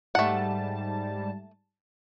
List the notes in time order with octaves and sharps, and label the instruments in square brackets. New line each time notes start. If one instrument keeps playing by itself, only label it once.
[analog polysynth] G#2 G3 A5 [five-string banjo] A3 F#5